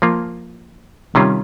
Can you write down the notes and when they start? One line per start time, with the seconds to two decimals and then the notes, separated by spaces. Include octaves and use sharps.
0.02 F3 A#3 F4
1.15 C3 D#3 G3 C#4 F4